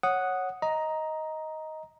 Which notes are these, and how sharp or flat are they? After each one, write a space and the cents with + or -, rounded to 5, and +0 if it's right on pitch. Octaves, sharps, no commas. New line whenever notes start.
C#5 -10 F#5 +0 D#6 +0
D#5 +10 A#5 +5